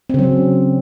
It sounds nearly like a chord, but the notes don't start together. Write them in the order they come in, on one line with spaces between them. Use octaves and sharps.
C4 C#3 F#3 C#4